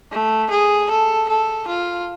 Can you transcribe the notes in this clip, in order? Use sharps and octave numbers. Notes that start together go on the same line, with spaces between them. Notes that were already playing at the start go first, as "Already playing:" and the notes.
A3
G#4
A4
A4
F4